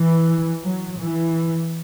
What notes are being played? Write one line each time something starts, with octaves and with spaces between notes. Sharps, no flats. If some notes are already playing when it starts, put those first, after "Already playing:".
Already playing: E3
F#3
E3